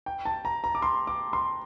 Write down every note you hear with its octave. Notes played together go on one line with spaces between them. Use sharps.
G5
A5
A#5
A#5
D6
C6
D6
C6